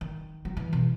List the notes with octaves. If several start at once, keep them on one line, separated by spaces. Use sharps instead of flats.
D#3
F#3
E3
B2